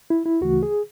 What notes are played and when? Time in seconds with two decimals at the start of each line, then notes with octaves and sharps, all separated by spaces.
0.10 E4
0.26 E4
0.41 D2 C#3 E3 A3 F#4
0.63 G#4